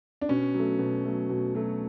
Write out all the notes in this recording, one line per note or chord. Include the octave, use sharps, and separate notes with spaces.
D4
B2 C#4
F#3 A3
B2
F#3 A3
B2
F#3 A3